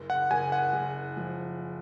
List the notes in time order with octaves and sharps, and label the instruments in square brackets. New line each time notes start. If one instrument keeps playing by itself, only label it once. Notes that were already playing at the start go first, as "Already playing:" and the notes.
Already playing: [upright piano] F#1
[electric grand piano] F#5
[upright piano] F#1 [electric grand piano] G#5
[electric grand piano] F#5
[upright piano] F#1
F3